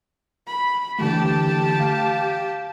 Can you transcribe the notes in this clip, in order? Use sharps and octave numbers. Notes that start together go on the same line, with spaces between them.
B5
D3 E3 A3 G4 A5
F5